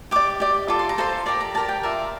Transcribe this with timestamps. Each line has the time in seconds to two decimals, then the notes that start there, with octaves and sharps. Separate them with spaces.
0.11 G4 D5 D6
0.40 G4 D5
0.68 F4 A4 D6
0.79 C6
0.89 A#5
0.98 F4 A4 C5 C6
1.26 G4 A#4 D5 A#5
1.41 A#5
1.54 G4 A#4 D5 A5
1.69 G5
1.83 F4 A#4 D5 E5